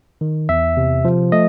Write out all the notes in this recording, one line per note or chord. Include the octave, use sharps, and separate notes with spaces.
D#3
E2 E5
C3
F3
A3 D#5